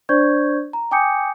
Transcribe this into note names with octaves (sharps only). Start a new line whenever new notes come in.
D4 C5 D5 C#6 G6 G#6
A#5
G5 G#5 D6 D#6 G6 C#7